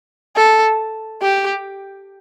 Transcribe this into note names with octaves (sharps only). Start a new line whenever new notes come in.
A4
G4